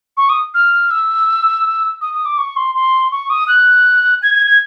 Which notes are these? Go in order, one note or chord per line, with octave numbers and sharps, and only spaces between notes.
C#6
D#6
F6
E6
D#6
D#6
D6
C#6
C6
C6
C#6
D#6
F#6
G#6
G#6
G#6